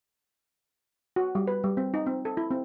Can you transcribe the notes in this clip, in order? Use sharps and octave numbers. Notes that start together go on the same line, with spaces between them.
F#4
G3
B4
G3
C4
D#4
C4
A4
E4
C4